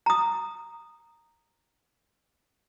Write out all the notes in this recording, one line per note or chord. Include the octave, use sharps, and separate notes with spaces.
A#5 D#6